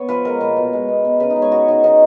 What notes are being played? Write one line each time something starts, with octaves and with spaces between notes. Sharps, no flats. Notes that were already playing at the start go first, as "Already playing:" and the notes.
Already playing: B3 C#5
F3 B4
G#3 A#4
A#2 B4
B2
G#3
B3
B2
C#3 B4
D#4
G#3
C#5
B3 F#4
C#3 D#4
C#3 D#4